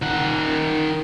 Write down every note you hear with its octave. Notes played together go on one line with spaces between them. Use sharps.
D#3 F#5